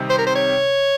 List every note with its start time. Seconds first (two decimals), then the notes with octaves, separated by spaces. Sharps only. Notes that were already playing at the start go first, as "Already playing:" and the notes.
Already playing: C3 D#3 G3 C4 D#4
0.10 C5
0.18 A#4
0.27 C5
0.36 C#5